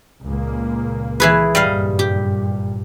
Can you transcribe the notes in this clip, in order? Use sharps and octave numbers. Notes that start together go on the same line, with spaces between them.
C#2 A#2 A#3
E3 G#4 B4
F#1 G2 A#2 G3 D#5 F5
G4